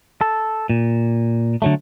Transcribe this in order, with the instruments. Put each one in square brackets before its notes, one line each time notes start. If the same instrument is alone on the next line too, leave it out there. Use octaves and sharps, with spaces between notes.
[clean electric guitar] A4
A#2
D3 F#3 A3